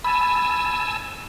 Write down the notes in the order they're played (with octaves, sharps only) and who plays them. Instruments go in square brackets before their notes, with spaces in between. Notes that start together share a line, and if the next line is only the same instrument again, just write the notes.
[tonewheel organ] G#5 A5 E6 [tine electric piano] B5